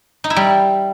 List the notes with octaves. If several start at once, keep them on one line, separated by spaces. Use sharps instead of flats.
D#4
E4
G3